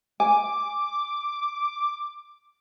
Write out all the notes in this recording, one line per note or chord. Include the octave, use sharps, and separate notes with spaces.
G#5 D6